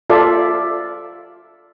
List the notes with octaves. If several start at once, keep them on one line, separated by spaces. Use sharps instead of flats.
F4 A4 D5 E5